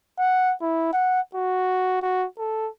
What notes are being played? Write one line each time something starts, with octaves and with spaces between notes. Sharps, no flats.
F#5
E4
F#5
F#4
F#4
A4